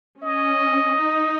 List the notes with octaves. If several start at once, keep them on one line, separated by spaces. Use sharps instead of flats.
C#4 D#5
D#4